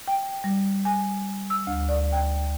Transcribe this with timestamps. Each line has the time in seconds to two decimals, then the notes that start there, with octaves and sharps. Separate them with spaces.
0.08 G5
0.44 G3
0.85 G#5
1.50 E6
1.67 D2
1.89 D5
2.12 G5